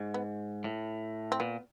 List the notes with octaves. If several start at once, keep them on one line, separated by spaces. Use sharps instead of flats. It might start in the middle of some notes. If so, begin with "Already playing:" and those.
Already playing: G#2
B3
A2
C4
A#2 B3